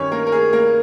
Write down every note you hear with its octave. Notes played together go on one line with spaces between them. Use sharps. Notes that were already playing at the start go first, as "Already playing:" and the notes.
Already playing: G2 D#3 C#4 C#5
A#3 A#4
A#4
G#4
A#3 A#4